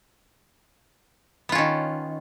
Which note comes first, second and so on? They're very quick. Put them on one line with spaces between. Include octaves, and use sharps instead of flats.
B3 F4 C#4 D#3